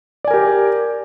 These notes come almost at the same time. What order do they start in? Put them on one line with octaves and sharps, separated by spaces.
D5 G#5 A#4 G4